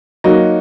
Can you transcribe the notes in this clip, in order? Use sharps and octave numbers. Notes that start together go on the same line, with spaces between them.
F#3 A#3 D#4 F#4